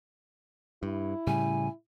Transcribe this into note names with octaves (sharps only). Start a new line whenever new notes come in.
G2 E4
A2 C#3 G3 G#5